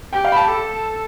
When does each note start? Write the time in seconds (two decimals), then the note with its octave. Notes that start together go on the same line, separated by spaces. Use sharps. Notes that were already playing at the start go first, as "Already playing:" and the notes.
0.13 G4 G5
0.25 F5
0.32 B5
0.37 A5
0.48 A4